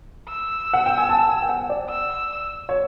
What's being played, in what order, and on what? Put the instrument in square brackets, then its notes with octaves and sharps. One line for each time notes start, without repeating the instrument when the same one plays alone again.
[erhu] E6
[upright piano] F#5
G5
G#5
A5
G#5
G5
F#5
D5
[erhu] E6
[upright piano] C#5